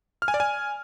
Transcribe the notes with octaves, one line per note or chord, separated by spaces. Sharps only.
F6
G#5
D5
G#5